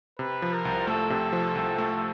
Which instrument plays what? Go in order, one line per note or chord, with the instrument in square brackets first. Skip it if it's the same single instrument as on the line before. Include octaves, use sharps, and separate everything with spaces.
[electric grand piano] C3 [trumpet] B4
[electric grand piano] F3
[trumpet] A#4
[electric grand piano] C2
[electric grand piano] A3 [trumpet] A4
[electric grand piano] C3
F3
C2
A3